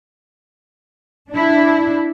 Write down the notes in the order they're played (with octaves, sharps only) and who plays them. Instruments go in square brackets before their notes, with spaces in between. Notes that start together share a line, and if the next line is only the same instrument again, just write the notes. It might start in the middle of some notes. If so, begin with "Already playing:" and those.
[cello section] D4 E4